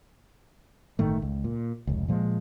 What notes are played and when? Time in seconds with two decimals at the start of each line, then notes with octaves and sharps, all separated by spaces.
0.99 G1 A2 D#3 A3
1.22 C#2
1.44 A#2
1.87 F1 C#2
2.08 A#2 F3 G3 G#3